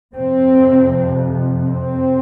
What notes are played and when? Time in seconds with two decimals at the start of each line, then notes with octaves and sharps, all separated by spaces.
0.14 F2 C3 C4
1.65 C4